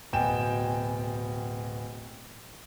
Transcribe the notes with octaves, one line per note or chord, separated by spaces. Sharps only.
D1 B2 G5 G#5 E7